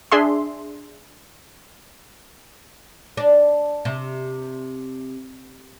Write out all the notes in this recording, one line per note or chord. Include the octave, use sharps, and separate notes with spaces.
D4 G#4 E5 C6
D4
C3